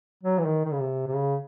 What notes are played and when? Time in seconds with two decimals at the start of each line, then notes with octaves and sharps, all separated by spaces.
0.23 F#3
0.38 E3
0.46 D#3
0.65 D#3
0.72 C#3
0.80 C3
1.07 C3
1.14 C#3